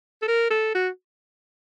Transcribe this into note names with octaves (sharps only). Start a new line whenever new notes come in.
A4
A#4
A4
F#4